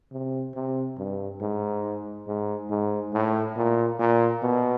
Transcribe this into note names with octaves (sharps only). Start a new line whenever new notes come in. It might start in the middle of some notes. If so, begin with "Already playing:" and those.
C3
C3
G2
G#2
G#2
G#2
A2
A#2
A#2
B2